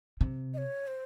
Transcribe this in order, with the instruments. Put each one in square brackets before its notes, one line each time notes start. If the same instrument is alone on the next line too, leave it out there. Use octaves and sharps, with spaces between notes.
[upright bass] C3
[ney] D#5
C#5
C5